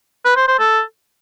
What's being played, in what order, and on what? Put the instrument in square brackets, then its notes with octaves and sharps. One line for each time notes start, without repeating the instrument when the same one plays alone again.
[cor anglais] B4
C5
C5
A4